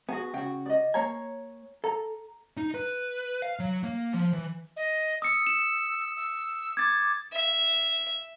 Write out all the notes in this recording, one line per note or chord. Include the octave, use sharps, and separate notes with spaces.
B3 F#4 G#4 G#5
C#3 F#4 G5
D5 D#5
A#3 C#5 G#5 A#5
A4 A#5
D#4
B4
F5
F#3
A#3
F3
E3
D#5
D#6 E6 C#7
E7
E6
D6 G#6 A6
E5